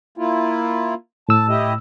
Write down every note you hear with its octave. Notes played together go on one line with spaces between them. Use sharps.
A#3 E4 F4
A2 A5 E6
E4 G4 D#5